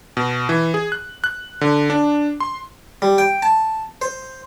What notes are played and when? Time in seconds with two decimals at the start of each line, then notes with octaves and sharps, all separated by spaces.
0.17 B2
0.49 E3
0.74 G#4
0.92 F#6
1.24 F#6
1.61 D3
1.90 D4
2.40 C6
3.02 G3
3.18 G5
3.43 A5
4.02 C5